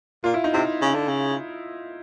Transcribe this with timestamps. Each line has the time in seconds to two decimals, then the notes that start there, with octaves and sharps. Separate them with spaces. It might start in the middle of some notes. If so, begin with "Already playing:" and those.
0.24 A#2 F4
0.34 E4
0.44 D#4
0.53 C3 E4
0.81 C#3
0.94 D3
1.08 C#3